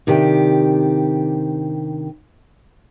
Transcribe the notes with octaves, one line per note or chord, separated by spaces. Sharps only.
C3 D#3 D4 G4